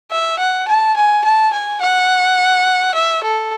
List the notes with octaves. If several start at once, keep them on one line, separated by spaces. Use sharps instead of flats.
E5
F#5
A5
G#5
A5
G#5
F#5
E5
A4